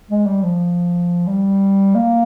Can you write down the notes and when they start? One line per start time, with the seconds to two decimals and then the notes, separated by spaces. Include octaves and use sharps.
0.11 G#3
0.26 G3
0.43 F3
1.27 G3
1.95 A#3